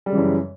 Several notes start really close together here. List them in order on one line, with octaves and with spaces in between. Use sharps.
G3 G#3 C#3 E3 F#2